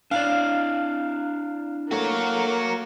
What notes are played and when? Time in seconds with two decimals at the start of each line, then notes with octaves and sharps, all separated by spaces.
0.11 D4 E4 D5 F5
1.91 A3 A#3 F#4 C#5